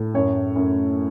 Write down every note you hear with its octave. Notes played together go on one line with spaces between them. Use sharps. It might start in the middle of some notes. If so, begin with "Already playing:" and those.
Already playing: A2
F#2 C#5
F#2